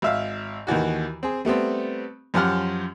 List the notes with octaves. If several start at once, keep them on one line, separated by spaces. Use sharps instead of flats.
G#1 E5 F5
D#2 D#3 E3 F#4
C4 G#4
G3 A3 B3 C4
F#2 F3 C#4 G4 F#5 F6